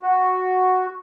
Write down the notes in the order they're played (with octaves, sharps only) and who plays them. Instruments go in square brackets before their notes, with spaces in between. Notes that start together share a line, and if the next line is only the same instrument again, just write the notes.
[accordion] F#4